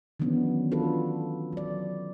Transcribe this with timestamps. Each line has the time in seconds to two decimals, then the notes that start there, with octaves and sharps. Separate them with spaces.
0.20 D#3 E3 F#3 B3 C#4 D4
0.72 B3 D4 F4 F#4 A4 B4
1.53 F#3 D5